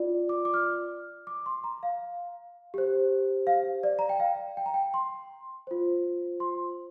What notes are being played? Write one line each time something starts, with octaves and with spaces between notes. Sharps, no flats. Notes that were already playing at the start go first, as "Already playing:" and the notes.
Already playing: F4 D5
D6
D6
F6
D6
C6
A#5
F5
G4 C5
F5
D5
A#5
G5
F5
G5
A#5
G5
C6
F4 C5
C6